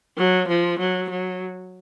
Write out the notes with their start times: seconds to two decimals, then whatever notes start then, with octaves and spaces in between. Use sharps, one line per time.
0.17 F#3
0.48 F3
0.79 F#3
1.10 F#3